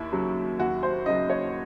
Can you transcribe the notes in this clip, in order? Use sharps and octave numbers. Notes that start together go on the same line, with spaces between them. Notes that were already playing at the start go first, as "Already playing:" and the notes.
Already playing: D#2 E4
C#3 F#3
D#2 F#4
C5
C#3 F#3 D#5
C#5